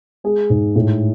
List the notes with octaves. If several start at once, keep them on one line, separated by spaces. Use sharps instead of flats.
G#3 G#4
G#2
A2